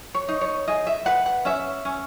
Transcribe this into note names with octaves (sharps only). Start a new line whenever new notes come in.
C#5
D#4
C#5
G#4 D#5
E5
B4 F#5
F#5
C#4 E5
C#4